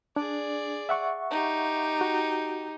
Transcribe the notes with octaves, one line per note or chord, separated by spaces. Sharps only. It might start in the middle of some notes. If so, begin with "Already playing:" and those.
D4 G#4 D5
E5 F#5 C#6
D#4 G4
F#4